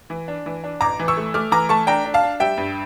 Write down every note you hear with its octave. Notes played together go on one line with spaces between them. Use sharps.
E3
D4
E3
D4
A1 A#5 D6
E3
C#6 E6
A3
A3 D6 F6
E3 A#5 D6
A3 A5 C#6
D4 G5 A#5
D4
F5 A5
D4
G3 E5 G5
G2